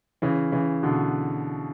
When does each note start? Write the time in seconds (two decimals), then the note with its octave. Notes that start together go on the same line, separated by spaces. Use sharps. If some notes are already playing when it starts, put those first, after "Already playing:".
0.22 C#3 E3
0.52 C#3 E3
0.83 B2 D3